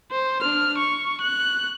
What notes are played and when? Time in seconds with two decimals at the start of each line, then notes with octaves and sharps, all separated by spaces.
0.12 C5
0.41 D4 F6
0.78 C#6
1.21 F#6